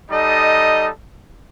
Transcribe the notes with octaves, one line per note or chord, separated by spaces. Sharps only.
G3 D#4 A4 D#5